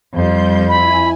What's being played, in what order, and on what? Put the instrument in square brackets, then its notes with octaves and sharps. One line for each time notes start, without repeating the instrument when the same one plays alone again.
[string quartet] F2 [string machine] G3 C6 G6
[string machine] E4 G#5 [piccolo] B5